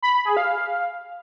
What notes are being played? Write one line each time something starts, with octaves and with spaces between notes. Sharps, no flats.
B5
B5
G#4
F5